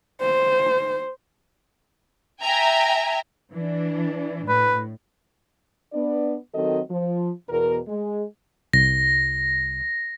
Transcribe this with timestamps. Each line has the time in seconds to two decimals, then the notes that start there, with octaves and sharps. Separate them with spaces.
0.21 C5
2.42 E5 G5 G#5 A#5
3.53 E3 D4
4.48 A2 B4
5.93 B3 D4 D5
6.54 D#3 F#3 C4 F#4 A4 D#5
6.90 F3
7.49 E2 B2 A#4
7.88 G#3
8.73 C2 A#6